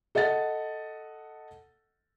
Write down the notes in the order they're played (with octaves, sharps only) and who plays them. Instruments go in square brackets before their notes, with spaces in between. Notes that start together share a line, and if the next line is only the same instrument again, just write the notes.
[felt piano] A4 D#5 F#5 A6